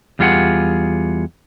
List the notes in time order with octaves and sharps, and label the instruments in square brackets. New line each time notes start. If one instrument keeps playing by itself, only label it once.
[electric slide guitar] E2 G3 F4 G#4 F#5